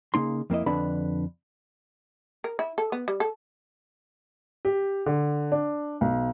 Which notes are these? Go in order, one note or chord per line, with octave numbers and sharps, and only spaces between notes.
C#3 A#3 D#4 C6
F2 A#3 E4 D#5
F2 D3 D4 B4 B5
A#4
E4
A4
B3
G3
A4
G4
D3
D4
B1